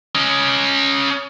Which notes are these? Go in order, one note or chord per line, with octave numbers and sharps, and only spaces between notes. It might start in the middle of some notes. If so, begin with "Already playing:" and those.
C#4 D#5